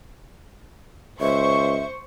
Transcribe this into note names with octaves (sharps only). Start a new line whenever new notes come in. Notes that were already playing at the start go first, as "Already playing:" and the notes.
C#2 C5 E5 C#6